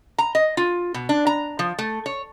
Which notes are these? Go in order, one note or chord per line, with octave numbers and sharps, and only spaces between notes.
A#5
D#5
F4
B2
D4
A#5
F3
A3
C#5